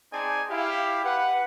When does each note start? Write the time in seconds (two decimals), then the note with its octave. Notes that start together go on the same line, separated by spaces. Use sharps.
0.12 C4 D#4 G#4 D5 G#5 A5
0.49 E4 G4 F5
1.04 B4 F#5